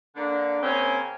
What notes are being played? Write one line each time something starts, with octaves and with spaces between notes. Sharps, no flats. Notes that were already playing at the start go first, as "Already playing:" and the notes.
D3 A#3 D4
C#3 A#3 C4 C#5 G#5